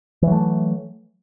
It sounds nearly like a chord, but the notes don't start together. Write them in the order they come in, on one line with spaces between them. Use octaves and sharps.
E3 F#3 A3